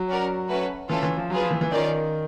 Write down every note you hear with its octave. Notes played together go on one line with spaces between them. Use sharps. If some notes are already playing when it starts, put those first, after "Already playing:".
Already playing: F#3
C#4 F#4 A#4 D5
A3 C#4 F#4 B4
E3 A3 C#4 F4 A4
E3
F3
F#3 F4 G#4 B4
F3
E3
E3
D#3 C#4 F4 A#4 D5